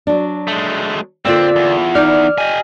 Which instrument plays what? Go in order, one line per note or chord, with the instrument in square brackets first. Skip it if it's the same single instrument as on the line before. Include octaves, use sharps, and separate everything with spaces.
[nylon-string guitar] F#3 D4
[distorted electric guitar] G#3 A3
[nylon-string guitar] D3 A#3 [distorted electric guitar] C4 [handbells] F4 E6 [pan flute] D5
[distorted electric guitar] E2
[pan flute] D#4 [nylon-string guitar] D5 [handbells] F6
[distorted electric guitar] G4 G#5 [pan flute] D#5